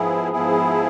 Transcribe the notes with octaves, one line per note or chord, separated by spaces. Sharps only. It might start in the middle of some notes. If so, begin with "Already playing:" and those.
Already playing: G#2 F3 B3 E4 G#4
G#2 F3 B3 E4 G#4